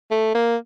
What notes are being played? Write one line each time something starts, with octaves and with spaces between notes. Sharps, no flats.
A3
A#3